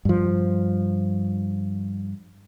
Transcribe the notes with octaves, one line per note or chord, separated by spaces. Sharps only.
G2 F3